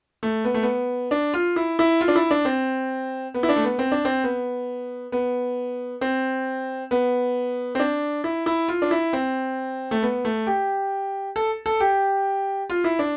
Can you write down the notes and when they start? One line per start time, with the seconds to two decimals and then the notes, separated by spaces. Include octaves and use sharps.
0.23 A3
0.45 B3
0.54 A3
0.63 B3
1.11 D4
1.34 F4
1.56 E4
1.79 E4
2.01 F4
2.08 D4
2.16 E4
2.31 D4
2.45 C4
3.34 B3
3.43 E4
3.49 D4
3.56 A3
3.64 B3
3.79 C4
3.92 D4
4.05 C4
4.24 B3
5.12 B3
6.01 C4
6.91 B3
7.75 C4
7.79 D4
8.24 E4
8.46 E4
8.68 F4
8.82 D4
8.91 E4
9.13 C4
9.91 A3
10.03 B3
10.25 A3
10.47 G4
11.36 A4
11.66 A4
11.80 G4
12.70 F4
12.84 E4
12.99 D4